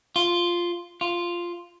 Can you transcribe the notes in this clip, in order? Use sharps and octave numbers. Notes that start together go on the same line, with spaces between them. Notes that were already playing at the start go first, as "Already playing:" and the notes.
F4
F4